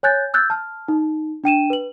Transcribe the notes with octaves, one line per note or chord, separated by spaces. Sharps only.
C#5 G#5 F#6 G6 A6
E6 F#6 G6 A6
A5 F6
D#4
D4 G5 D#7 E7
B4 F#7